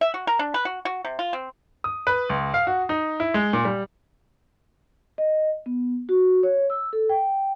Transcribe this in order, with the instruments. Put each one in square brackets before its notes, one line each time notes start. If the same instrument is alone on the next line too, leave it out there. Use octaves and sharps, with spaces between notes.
[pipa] E5
F#4
A#4
D4
B4
F#4
F#4
C3
F4
C4
[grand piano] D#6
B4
C#2
F5
F#4
D#4
E4
G#3
A#2
G3
[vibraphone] D#5
B3
F#4
C#5
E6
A4
G5